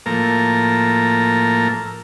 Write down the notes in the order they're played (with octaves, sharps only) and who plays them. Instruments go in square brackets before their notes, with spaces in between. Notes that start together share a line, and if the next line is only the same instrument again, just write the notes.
[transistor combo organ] A2 F3 A#3 A4 A#4